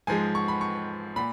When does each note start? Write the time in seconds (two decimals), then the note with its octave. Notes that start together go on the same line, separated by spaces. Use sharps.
0.07 G#2 F3 G#3 G#5
0.35 C#6
0.48 B5
0.61 C#6
1.16 A#2 B5